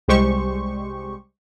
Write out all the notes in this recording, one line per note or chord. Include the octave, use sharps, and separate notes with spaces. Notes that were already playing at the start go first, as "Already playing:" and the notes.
C2 G3 G#3 G4 C5 C#6